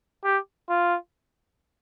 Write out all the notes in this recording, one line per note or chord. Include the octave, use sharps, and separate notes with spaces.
G4
F4